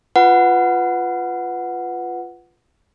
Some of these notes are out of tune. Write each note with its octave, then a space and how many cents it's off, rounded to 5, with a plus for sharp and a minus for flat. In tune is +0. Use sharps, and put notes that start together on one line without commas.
F4 -5 B4 +5 F#5 +0